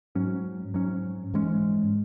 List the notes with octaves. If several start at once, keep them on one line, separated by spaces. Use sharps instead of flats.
G#2 F#3 C#4
G#2 F#3 C#4
G#2 E3 G#3 C#4